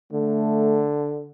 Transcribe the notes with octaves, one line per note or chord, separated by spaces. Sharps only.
D3 A3